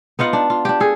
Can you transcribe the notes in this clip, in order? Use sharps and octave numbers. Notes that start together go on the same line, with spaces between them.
B3 D#4 F4 F#5
D4
F4
D4 G4
G#4 A4